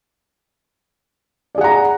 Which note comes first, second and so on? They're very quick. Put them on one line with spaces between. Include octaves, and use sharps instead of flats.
D5 G#4 F#5 A#5